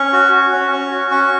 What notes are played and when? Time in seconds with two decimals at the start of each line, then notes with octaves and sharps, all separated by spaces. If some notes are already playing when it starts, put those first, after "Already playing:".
Already playing: C#4 C#6
0.13 F#4
0.32 F#4
0.52 C#4
0.71 C#4
0.91 F#4
1.11 C#4 C#6